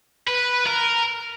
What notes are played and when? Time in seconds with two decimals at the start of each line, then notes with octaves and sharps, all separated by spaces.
0.28 B4
0.67 A#4